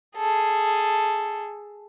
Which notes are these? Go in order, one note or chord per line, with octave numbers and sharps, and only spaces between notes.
G#4 A4